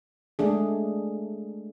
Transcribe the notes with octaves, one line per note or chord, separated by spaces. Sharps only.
G#3 A3 D4 G#4